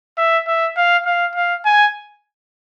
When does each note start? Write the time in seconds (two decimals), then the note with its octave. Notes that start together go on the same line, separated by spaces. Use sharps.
0.18 E5
0.47 E5
0.77 F5
1.06 F5
1.35 F5
1.65 G#5